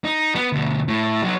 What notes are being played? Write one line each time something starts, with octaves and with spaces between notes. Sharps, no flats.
D#4
B3
D2 B2
A2
F#3 D#4